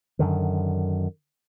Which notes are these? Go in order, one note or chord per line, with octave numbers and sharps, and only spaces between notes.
F#2 D3 D#3